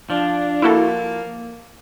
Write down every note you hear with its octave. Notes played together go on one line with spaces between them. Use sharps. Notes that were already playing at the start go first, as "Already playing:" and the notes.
F3 D4
A#3 E4 F#4 A4